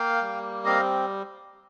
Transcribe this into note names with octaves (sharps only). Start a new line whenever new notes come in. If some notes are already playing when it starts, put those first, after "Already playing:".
Already playing: A#3 F5 G5
G3
C4 D#5 F5